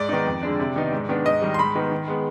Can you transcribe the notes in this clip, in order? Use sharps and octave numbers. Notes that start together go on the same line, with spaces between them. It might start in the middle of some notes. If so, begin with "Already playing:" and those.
Already playing: G#2 D5
D#3 B3 D#4
F2
D3 G#3 D4
C3
D#3 B3 D#4
G#2
D#3 B3 D4
G#2 D#5
D#3 G3
C6
G#2 B5
D#3 B3 D#4
D#3
G#3 B3